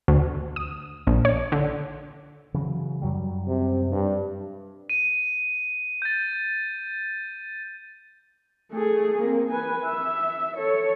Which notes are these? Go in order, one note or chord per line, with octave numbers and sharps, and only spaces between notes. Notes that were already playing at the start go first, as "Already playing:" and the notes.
D2
D#6
A#1
C#5
D3
C#3 E3 F#3
F#2 F#3 G3
C3
G2
D#7
G6 A6
A3 G#4
A#3 C4
B4 G#5
E5
A4 C#5